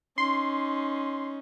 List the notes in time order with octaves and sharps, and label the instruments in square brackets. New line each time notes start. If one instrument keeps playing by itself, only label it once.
[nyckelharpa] C#4 D#4 [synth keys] C6